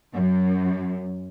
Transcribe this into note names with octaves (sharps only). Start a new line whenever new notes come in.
F#2